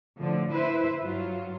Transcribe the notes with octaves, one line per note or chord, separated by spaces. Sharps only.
A2 D3 F3
E4 B4 C5 E5
G2 F#3 F4